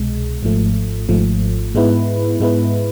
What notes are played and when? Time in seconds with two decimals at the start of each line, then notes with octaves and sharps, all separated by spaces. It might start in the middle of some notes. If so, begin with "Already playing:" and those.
Already playing: C2 B2 G#3
0.43 G#1 G#2 F3 A3
1.09 G#1 G#2 F3 A3
1.75 G#2 G#3 B3 E4 B4
2.40 G#2 G#3 B3 E4 B4